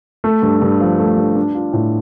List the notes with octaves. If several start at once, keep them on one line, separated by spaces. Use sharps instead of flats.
A3
G2
G2
F3
A3
G2
D4
F4
A2